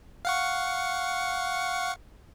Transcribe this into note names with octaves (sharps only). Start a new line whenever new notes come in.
F5 F#5 C#6